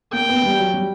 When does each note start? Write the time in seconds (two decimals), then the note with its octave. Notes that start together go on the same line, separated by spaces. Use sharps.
0.13 A#3 G5
0.29 B3
0.44 G3
0.59 F#3
0.74 G3